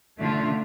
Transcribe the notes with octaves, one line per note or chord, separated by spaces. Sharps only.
D3 A3 D4 F4